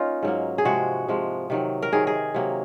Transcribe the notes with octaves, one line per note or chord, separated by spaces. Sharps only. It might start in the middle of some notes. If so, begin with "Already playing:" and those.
Already playing: A#3 C#4 D#4 F4
G#2 F#3 A#3
G#4
C3 F3 G#3 F#4
C3 F3 G#3
C3 D#3 F#3
A#4
C3 D#3 F#3 G#4
G#4
C3 F#3 A#3